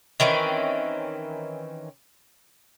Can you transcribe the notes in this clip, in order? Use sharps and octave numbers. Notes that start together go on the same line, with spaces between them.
D#3 E3 C4 C#4